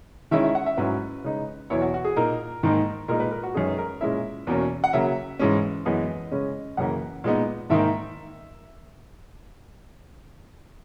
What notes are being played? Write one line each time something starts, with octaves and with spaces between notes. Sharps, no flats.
D#3 G#3 C#4 E4 E5
E5
F#5
E5
G#2 F#3 C#4 E4 B4
C#3 G#3 D#4
E2 B2 F#3 B3 E4 C#5
F#4
F#4
G#4
A#2 A#3 D#4 A#4
G#2 D#3 A#3 D#4
A#2 G#3 D#4 A#4
B4
A#4
F#4
F#2 D#3 G#3 C#4 G#4
B4
A#4
A#2 G#3 C#4 E4 E5
E2 B2 A#3 C#4
F#5
C#3 F#3 A#3 E5
G#2 E3 G#3 C#4
F#2 E3 G#3 B3 D#5
C#3 G#3 C#4
F#2 C#3 E3 A#3 F#5
A#2 G#3 B3 D#4
G#2 D#3 A#3 D#4 E5